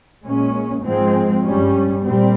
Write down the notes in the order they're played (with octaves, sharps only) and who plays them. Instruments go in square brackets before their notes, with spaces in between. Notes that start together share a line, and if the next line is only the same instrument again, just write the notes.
[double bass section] A#2 G#3 C#4
G#2 F3 G#3 C4
G2 G3 C#4
A#2 G3 C4